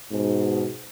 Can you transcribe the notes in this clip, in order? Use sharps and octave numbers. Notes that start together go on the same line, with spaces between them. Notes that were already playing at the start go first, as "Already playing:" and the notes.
G#2 B2